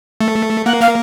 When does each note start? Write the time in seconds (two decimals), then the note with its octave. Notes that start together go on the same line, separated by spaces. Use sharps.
0.21 A3
0.66 A#3 F#5
0.82 F5